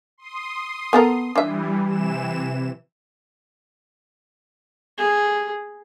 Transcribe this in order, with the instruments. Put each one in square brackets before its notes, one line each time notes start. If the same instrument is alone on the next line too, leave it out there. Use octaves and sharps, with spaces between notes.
[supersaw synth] C6 D#6
[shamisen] B3 A4 A#4
[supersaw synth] E3 G3 [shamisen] D4 E5
[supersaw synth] C3 E3 E7
[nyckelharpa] G#4